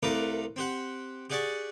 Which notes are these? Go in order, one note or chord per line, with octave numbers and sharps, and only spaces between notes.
C2 A3 A#4 B4 F5 D6
C4 G4 F#5
G4 G#4 D5 F#5 A5 C#6